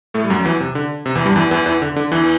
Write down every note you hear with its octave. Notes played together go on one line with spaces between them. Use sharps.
A2 A3
G3
F#2 F#3
F#3
E2 E3
C3
D3
C3
E2 E3
G2 G3
E2 E3
E2 E3
E2 E3
D3
D3
E2 E3